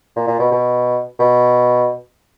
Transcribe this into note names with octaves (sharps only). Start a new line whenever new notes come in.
A#2
A#2
B2
B2
B2